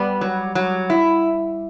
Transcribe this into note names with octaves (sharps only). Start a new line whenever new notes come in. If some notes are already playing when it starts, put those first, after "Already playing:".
Already playing: G3 B3
F#3
F#3
E4